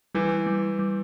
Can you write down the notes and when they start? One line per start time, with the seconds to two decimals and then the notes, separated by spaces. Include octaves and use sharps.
0.15 E3 G3
0.47 G3
0.79 G3